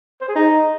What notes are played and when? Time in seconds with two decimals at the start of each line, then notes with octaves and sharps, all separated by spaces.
0.21 C5
0.28 G#4
0.35 D#4